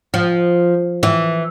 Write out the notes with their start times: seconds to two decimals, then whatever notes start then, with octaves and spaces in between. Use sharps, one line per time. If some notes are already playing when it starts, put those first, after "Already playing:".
0.14 F3
1.03 E3